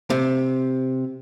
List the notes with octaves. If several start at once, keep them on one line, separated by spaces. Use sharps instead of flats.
C3